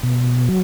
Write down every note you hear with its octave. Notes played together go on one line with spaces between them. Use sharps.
B2
F#3